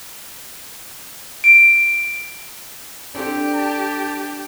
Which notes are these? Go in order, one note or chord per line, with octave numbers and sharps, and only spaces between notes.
D7
C4 D4 G4 A4
A5